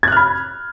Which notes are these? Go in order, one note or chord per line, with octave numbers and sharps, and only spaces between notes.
B5 F6 F#6 G#6